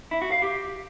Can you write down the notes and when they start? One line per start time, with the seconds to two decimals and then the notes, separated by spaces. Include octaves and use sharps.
0.11 E4
0.22 F#4
0.32 F5
0.42 G4